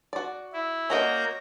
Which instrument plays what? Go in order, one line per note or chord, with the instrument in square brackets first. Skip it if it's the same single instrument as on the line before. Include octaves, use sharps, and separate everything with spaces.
[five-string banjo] F#4 D5
[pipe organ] E4
[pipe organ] A#3 A#5 G6 [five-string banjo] C#4 F#4 D#5